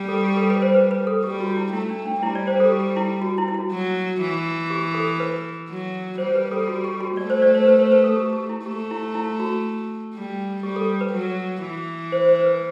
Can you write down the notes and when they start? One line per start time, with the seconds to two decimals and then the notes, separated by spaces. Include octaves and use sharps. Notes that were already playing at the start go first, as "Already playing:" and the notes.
Already playing: G3
0.09 A4
0.25 G4
0.37 A4
0.50 B4
0.62 C5
0.74 B4
0.91 B4
1.07 A4
1.23 G3 G4
1.40 F#4
1.57 E4
1.73 A3 E4
1.90 D4
2.06 D4
2.22 G3 E4
2.35 D5
2.47 C5
2.60 A4
2.72 G4
2.97 E4
3.22 F#4
3.38 E4
3.48 E4
3.54 F#4
3.71 F#3
4.20 E3
4.70 G4
4.94 A4
5.20 B4
5.69 F#3
6.18 G3 C5
6.35 B4
6.51 A4
6.68 F#4
6.84 G4
7.00 F#4
7.17 A3 D5
7.30 C5
7.42 D5
7.55 C5
7.67 B4
7.79 C5
7.92 B4
8.04 A4
8.16 G4
8.33 G4
8.49 E4
8.66 A3 G4
8.91 E4
9.15 E4
9.40 F#4
10.14 G3
10.63 G3 G4
10.76 A4
11.01 B4
11.13 F#3
11.63 E3
12.12 C5
12.29 C5
12.45 B4